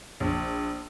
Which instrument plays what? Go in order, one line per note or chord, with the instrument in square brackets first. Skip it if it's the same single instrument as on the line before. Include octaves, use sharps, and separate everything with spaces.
[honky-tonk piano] A#1